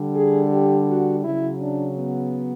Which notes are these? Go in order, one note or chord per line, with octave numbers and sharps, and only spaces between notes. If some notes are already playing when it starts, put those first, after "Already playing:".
Already playing: D3 G3
G#4
G4
F#4
C#3 F#3 E4
D4
B3